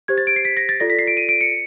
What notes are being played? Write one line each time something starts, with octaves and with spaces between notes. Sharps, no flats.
G4 C5 G#6
A6
D7
C7
B6
A#6
A6
F4 A4 D5 A#6
B6
C7
D7
D#7
D7
C#7